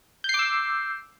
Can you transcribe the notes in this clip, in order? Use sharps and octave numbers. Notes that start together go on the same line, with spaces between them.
D6 E6 G6 C7